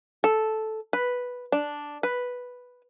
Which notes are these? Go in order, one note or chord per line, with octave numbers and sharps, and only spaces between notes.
A4
B4
D4
B4